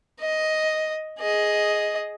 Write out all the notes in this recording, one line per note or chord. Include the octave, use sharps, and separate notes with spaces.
D#5
G#4 D#5